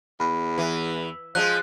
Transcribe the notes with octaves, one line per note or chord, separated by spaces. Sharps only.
E2 B5
E3
F3 G3 G#3 F#6